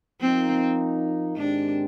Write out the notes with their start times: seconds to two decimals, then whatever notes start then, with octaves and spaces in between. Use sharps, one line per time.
0.21 F3 A#3 C4 D#4
1.37 G#2 D#3 G#3 C4 D4 G4